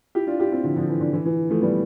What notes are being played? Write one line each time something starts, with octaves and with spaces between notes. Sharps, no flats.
E4 G4
D4 F4
E4 G4
C4 E4
D3 F3
D3 F3
E3
D3
E3
E3
F3 A3
G3 B3